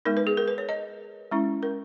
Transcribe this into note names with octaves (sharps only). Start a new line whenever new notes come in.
G#3 B3 D#4 A#4
B4
G#4
A#4
B4
C#5
D#5
G#3 C#4 E4
A#4